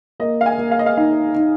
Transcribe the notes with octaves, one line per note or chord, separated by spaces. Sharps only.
A#3 D#5
F5
G#5
A#3
F5
D#5
F5
D#4 F5
D#4